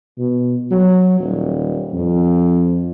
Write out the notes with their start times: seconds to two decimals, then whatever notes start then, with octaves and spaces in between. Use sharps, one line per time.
0.18 B2
0.71 F#3
1.19 D#1
1.93 F2